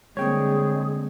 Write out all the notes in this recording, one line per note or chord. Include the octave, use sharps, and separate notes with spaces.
D3 G3 G#3 A#3 C4 G#4 C#5 G5